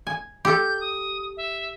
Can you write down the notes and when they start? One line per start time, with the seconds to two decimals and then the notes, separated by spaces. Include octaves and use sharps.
0.07 G#5
0.45 G4 A4 G6
0.81 D#6
1.37 E5